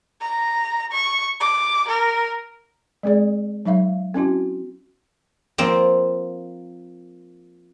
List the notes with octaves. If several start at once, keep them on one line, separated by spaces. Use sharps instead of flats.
A#5
C#6
D6
A#4
G#3 C4 G#4 D5
F#3 D#4 E5 F5
C4 C#4 E4 F#4
F3 A#3 C4